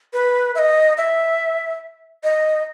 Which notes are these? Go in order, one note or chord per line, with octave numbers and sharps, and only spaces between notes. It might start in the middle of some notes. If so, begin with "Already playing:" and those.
B4
E5
D#5
E5
D#5